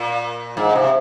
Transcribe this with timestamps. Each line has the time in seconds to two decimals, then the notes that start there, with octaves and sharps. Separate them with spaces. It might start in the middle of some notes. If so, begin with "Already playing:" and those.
Already playing: A#2
0.57 G#2
0.75 C3